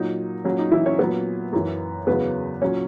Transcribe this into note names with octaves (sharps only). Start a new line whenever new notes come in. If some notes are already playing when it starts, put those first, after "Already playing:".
Already playing: A#2 F#3 D#4
A#2 F#3 C#4
D#4
E3 E4
C#4 C#5
A#2 F#3 B3 B4
F#2 E3
E2 C#3 F#3 B3 B4
A#2 F#3 C#4 C#5